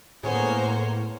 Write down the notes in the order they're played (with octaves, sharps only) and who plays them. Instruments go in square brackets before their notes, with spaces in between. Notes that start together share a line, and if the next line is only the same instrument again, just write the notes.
[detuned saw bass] A2 [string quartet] A#3 C5 C#5 [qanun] B3 C#4 G#4